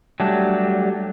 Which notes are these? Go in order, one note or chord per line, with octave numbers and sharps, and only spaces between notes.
F#3 G3 A3 D4